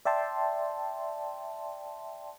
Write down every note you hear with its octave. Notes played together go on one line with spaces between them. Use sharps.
D5 E5 G5 A5 C6